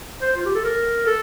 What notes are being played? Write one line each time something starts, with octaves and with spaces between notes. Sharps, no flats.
C5
F4
G4
A4
A#4
A4